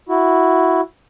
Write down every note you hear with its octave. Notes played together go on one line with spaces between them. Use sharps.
E4 F#4